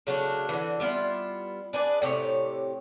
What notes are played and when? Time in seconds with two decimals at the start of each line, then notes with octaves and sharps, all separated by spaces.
0.07 C#3 F#3 A3 D4
0.49 D3 E3
0.80 G3 B3 E4 F4
1.73 D4 G#4 B4 D5
2.02 A2 C3 G4 C#5